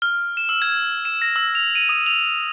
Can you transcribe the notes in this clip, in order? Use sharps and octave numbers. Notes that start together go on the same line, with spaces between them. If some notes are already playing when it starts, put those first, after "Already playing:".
F6
E7
E6
G#6
E7
A#6
E6
F7
D#7
D#6
F7